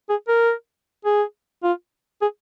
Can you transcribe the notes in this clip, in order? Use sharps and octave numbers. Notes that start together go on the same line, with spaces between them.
G#4
A#4
G#4
F4
G#4